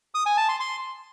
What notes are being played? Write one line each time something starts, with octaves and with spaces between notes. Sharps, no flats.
D#6
G#5
A5
C6
C6